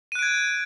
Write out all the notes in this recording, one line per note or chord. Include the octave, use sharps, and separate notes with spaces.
F#6 G#6 D7 D#7